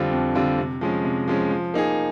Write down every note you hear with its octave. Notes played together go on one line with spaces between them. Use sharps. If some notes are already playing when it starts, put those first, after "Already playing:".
Already playing: F2 D3 G3 C4 F4
F2
D3 G3 C4 F4
C3
F3 G#3 C#4
C3
F3 G#3 C#4
F3
A#3 D#4 G#4